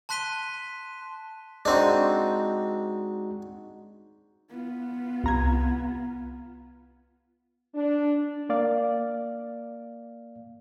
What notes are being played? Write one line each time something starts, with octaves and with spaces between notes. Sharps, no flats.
A5 C6 F#6 B6 D#7 G7
G#3 C4 D4 D#4 F#4
B3 F4
C2 A#5 G#6
D4
A#3 D5 F5